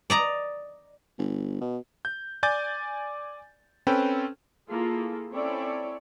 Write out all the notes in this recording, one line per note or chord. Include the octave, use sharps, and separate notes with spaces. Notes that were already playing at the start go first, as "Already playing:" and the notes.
D5 D#5 A#5
G1
B2
G6
D5 G#5 D6 G6 A6
C4 C#4 A4 B4 G5
A#3 E4 F4 G#4 A4
C4 C#4 E4 A4 C#5 D5